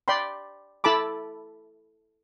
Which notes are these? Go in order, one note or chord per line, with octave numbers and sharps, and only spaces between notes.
D5 G5 B5 C6
E4 A4 A5 B5 D6